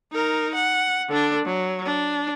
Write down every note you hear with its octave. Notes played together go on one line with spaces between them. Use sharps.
D#4 A#4
F#5
D3 D4
F#3
D4